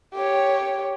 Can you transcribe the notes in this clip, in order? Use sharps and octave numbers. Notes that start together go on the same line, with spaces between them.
G4 C#5